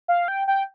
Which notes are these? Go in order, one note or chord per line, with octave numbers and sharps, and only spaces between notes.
F5
G5
G5